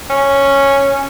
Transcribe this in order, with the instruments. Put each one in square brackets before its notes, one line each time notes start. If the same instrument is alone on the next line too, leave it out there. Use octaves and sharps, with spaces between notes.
[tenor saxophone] C#4